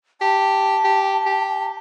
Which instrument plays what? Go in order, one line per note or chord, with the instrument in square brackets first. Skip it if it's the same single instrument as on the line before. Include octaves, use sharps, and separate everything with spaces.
[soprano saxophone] G4 [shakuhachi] A5
[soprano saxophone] G4
G4